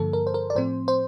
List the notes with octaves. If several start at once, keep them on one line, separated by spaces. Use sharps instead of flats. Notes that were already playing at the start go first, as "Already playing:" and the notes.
Already playing: G2 D3 F3 A#3 A4
A#4
C5
A#4
D5
A2 F3 C4 C5
C5